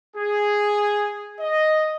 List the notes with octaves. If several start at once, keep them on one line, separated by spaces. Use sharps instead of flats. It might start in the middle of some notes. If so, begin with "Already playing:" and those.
G#4
D#5